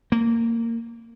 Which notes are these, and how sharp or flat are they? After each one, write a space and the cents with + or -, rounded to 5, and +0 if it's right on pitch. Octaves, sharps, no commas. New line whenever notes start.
A#3 -20